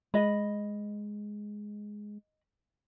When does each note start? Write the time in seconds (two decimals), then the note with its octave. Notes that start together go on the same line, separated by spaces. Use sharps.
0.14 G#3 D#5 B5